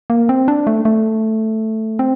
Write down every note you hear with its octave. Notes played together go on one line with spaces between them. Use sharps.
A#3
C4
D4
A3
A3
C4